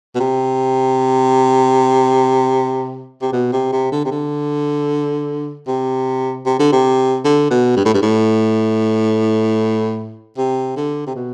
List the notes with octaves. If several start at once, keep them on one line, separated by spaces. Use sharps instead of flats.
B2
C3
C3
B2
C3
C3
D3
C3
D3
C3
C3
D3
C3
D3
B2
G2
A2
G2
A2
C3
D3
C3
B2